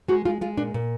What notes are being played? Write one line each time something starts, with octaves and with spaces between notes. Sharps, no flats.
G#3 F#4
G#3 F4
G#3 F4
A#2 D4
A#2